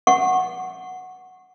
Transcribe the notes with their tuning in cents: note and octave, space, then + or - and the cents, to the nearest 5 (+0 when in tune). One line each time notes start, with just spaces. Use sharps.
F#5 +0 C#6 -25